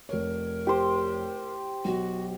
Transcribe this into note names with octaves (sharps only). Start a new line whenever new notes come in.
F1 A#4 C#5
G4 C5
B1 F#4